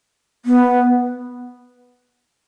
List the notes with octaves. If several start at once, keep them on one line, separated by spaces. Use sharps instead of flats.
B3